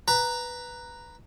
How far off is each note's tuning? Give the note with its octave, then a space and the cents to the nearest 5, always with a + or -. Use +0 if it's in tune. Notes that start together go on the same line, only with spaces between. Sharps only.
B4 +0 A#5 +0